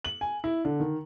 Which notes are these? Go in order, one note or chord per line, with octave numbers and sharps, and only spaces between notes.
F#7
G#5
E4
D3
D#3